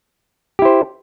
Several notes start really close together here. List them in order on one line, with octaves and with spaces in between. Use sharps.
G4 E4 C5